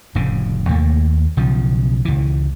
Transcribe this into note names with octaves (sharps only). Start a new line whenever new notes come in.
F1 A2 C#3
D#2 A3 A#3
B1 C#3 F3
C#2 E3